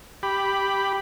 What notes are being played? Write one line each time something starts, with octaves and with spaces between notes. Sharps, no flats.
G4 B5